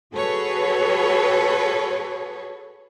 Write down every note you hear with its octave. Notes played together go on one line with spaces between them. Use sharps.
F#4 G#4 A4 B4 C#5